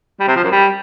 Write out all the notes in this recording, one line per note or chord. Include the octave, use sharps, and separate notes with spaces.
G3
C3
F3
F#2
G3